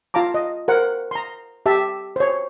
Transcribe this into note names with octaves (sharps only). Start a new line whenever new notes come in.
F4 F5 A5 A#5 D6
D#5
A#4 C5 F#5
A#5 C6
G4 E5 A5
C5 C#5